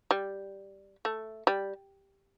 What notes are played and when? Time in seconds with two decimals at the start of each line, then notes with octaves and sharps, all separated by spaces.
0.11 G3
1.05 A3
1.47 G3